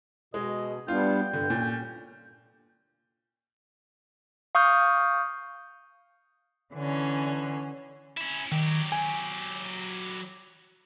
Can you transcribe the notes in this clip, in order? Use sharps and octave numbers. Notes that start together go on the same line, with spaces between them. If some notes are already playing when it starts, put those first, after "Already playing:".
B2 G#3 D#5
G3 B3 D4 F4 G5
G2 D3
A#2 C#4
F5 C#6 D#6 F6 G6
D3 E3 C#4
C#4 E4
D#3 F#3 G4
G#5